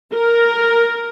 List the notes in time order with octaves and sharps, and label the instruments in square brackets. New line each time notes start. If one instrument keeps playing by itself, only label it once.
[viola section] A#4